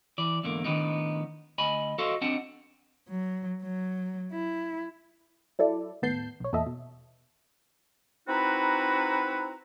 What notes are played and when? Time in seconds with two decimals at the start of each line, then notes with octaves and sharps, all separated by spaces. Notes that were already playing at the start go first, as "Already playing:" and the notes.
0.18 E3 D5
0.43 E2 G#2 D3 A#3
0.64 A2 D#3 E3 B3 D4 D#4
1.58 D2 D#5 G#5 B5
1.98 F#4 A4 C5 D#5 F5
2.21 C4 D4 D#4 F#5 A5
3.09 F#3
3.63 F#3
4.32 E4
5.59 F#3 E4 A4 D5
6.02 D#2 A2 B3 A5 G6 C7
6.40 B1 C#5
6.53 E2 A#2 A4 D#5 E5
6.66 B2
8.27 C4 D#4 E4 F#4 B4 A#5